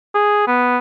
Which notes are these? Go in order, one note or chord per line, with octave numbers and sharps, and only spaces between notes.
G#4
B3